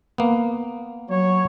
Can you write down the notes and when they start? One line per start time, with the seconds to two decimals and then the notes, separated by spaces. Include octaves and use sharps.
0.18 A#3 B3
1.10 F#3 C#5